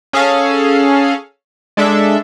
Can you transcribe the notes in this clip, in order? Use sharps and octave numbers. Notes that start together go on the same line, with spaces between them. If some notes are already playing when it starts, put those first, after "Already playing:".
C#4 G#4 A4 F5
G#3 D4 A4 E5